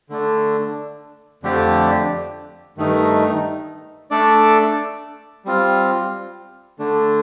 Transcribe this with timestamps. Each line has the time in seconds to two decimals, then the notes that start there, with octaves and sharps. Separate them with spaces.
0.09 D3 A3 D4
1.43 F2 D3 A3 D4 G4
2.77 G2 D#3 A3 D#4
4.11 A3 D4 A4 D5
5.45 G3 C4 F4
6.79 D3 A3 D4